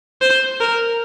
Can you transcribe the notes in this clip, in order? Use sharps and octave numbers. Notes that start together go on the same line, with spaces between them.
C5
A#4